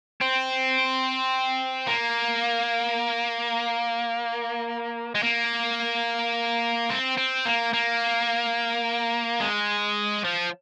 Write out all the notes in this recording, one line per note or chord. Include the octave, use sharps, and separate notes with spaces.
C4
A#3
G#3
A#3
C4
C4
A#3
A#3
G#3
F3